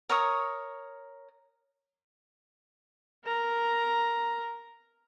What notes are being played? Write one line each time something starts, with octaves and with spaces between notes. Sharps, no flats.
A#4 C#5 C#6 D#6
A#4 A#5